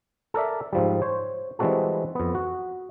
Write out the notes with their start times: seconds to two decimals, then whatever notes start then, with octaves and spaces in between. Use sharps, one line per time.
0.34 A4 A#4 D5 E5
0.73 G#2 F3 G3
1.02 C5 C#5
1.59 E3 G3 G#3 C4 F#4 A4
2.15 F2 B3
2.35 F#4